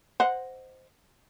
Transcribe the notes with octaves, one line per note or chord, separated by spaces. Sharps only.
C5 D#5 F#5